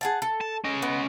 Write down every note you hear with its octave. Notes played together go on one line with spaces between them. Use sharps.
G#4 F#5 A5
A4
A5
C#4 D#5
B3